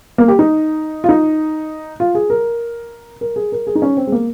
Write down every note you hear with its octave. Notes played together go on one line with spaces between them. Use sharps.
A#3
G4
D#4
F4
D#4
F4
G#4
A#4
A#4
G#4
A#4
G#4
D#4
C#4
C4
G#3
A#3